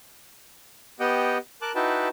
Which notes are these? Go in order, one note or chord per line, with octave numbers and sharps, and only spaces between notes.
B3 G4 D#5 F#5 G5
A#4 A5 D6 F#6
D#4 E4 F#4 B4 G5 A5